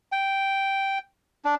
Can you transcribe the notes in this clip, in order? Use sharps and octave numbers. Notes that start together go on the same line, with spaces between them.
G5
D4